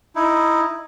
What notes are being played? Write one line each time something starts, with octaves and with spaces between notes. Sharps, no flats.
D#4 E4